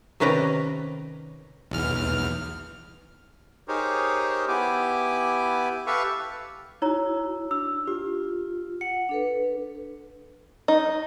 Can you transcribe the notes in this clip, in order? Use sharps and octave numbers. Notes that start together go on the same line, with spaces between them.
C3 D#3 C#4 B4 D5 A#5
B1 E2 F6
D#4 G4 G#4 A#4 C5 C#5
B3 E4 G4 G#5 D6
G4 A4 B4 E5 F5 C#6
D#4 E4 F#4 C#5 A#5
D4 E6
F4 G4
F#5 C#7
D4 A4 B4
D#4